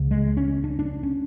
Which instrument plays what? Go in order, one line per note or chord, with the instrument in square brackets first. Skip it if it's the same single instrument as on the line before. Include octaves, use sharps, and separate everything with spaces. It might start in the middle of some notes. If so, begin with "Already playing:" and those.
Already playing: [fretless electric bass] C#2 C#3
G#3
C#4
D4
D4
C#4